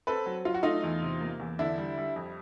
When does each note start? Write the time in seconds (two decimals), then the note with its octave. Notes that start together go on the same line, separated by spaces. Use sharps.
0.07 C4 A4 B4
0.26 F#3
0.45 F#3 F4
0.54 F#4
0.63 A3 D#4 F4
0.84 E2
1.02 C3
1.21 A#3
1.40 E2
1.59 D3 D4 E4
1.78 G3
1.98 G3
2.16 F2